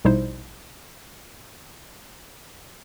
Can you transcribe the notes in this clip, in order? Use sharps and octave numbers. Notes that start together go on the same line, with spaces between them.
A#1 B2 G3 D#4 E4 C5